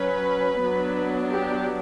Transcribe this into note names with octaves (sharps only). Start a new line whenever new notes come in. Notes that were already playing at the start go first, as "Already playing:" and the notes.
Already playing: F#3 C#4 B4
F#3 B3 D4
G4